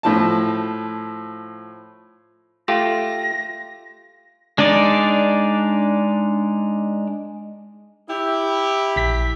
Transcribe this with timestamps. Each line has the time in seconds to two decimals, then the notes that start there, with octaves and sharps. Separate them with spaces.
0.03 A2 F3 A5
2.68 A3 F4 G4 A#6
4.58 G#3 D4 D#4 D5
8.10 E4 G4
8.96 A#1 B6